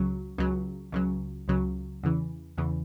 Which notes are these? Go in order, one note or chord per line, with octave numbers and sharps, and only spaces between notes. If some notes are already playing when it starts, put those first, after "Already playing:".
Already playing: C#2 C#3 F#3
C#2 C#3 F#3
C#2 C#3 F#3
C#2 C#3 F#3
E2 C#3 E3
E2 C#3 E3